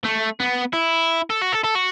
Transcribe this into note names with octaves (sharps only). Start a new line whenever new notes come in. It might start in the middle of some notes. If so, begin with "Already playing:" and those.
A3
B3
E4
A4
F#4
A4
A4
F#4